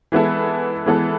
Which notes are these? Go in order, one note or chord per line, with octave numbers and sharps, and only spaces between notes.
E3 G#3 B3 E4 A4
E3 G#3 B3 E4 A4